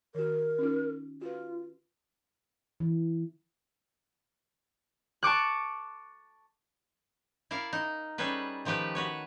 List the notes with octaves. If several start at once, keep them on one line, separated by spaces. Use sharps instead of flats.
D#3 F#4 A#4
C#4 D#4 F4
F4 F#4 B4
E3
A5 C#6 D6 F#6
E4 A#4 D5 F5
D#4
G3 C#4 G#4 A4 B4
D#3 F3 A3 G4 B4
F#4 B4 C#5